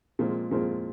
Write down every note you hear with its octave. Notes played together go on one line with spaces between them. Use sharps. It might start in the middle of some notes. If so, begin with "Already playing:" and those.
A#2 F3 G#3 C4
A#2 F3 G#3 C4